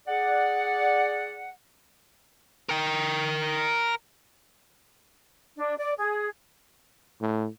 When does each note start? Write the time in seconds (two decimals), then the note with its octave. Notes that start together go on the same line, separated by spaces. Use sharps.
0.08 G#4 D5 F#5
2.69 A#4 G5
5.56 D4
5.78 D5
5.98 G#4
7.21 A2